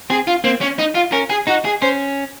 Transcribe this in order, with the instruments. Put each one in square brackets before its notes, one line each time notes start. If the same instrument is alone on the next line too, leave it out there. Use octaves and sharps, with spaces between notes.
[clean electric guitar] C4 [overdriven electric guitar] G#4
[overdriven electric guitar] F4
[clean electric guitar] A#3 [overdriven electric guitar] C4
[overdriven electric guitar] C#4
D#4
F4
[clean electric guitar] C#4 [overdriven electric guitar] A#4
[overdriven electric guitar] G#4
[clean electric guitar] D#4 [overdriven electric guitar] F#4
[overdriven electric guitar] G#4
[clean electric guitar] C#4 [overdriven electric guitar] C5